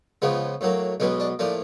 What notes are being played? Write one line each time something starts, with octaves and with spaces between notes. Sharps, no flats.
C#2 C#3 F3 G#3 B3
A2 F#3 A#3
B1 B2 G#3 B3 C#4
D4
A2 F3 A#3 D4